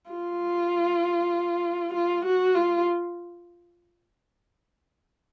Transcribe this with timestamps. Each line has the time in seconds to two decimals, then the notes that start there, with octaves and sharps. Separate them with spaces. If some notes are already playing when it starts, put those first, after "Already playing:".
0.11 F4
1.94 F4
2.25 F#4
2.55 F4